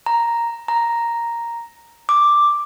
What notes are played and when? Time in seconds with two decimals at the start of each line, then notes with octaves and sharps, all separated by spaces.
0.06 A#5
0.68 A#5
2.09 D6